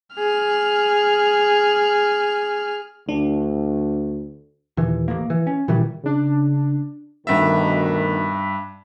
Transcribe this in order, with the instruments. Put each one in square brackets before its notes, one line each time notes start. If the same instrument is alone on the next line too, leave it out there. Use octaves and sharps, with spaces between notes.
[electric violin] G#4 F6
[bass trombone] D2 [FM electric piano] D4
[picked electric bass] D#2 A#2 E3
A1 A#3
E3
C#4
A#2 D#3 E3 G3
[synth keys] C#3 D4
[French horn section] D2 B2 D#3 [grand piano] G2 E5